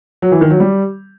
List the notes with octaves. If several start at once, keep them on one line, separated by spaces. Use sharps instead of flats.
F#3
E3
D#3
F#3
G3